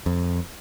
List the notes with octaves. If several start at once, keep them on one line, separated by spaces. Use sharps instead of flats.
F2